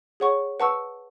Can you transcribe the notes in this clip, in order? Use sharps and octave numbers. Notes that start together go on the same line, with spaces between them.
G#4 C#5 F#5 C#6
B4 F#5 A5 C#6 E6